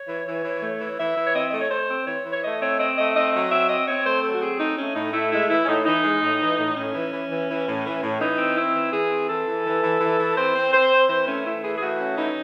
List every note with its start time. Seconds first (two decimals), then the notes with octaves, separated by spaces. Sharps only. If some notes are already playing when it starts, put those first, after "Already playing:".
Already playing: C#5
0.08 E3
0.26 E3
0.44 E3
0.62 A3
0.81 E3
0.99 E3 E5
1.17 E3
1.24 C#5
1.35 C4 D#5
1.50 A3 D#5
1.61 C#5
1.70 A3 C5
1.90 C4
2.07 E3 C#5
2.25 E3
2.32 C#5
2.44 A3 D#5
2.61 C4 C#5
2.79 C4 D#5
2.97 A3 D#5
3.15 C4 D#5
3.33 F#3 D#5
3.51 C4 E5
3.69 C4 D#5
3.87 C4 C#5
4.06 A3 C5
4.23 F#3 A4
4.34 F#4
4.42 C4 G#4
4.59 A3 D#4
4.78 A3 C#4
4.96 A2 D#4
5.13 A3 E4
5.32 G#3 E4
5.50 E3 E4
5.63 C#4
5.68 A2 D#4
5.86 E3 D#4
6.04 G#3
6.23 A2
6.41 E3
6.58 A2
6.77 A2 C#4
6.95 E3
7.13 E3
7.30 E3
7.49 E3
7.67 A2
7.85 E3
8.03 A2
8.21 E3 D#4
8.39 C4
8.57 C4 E4
8.75 E3
8.93 E3 G#4
9.11 C4
9.29 E3 A4
9.47 E3
9.66 E3
9.83 E3
10.01 E3
10.19 E3
10.37 C4 C5
10.56 C4
10.73 C4 C5
10.92 C4
11.09 E3 C5
11.28 A3 C#4
11.46 A3 E4
11.63 E3 G#4
11.78 G#4
11.82 A3 F#4
12.00 C#4
12.18 E3 D#4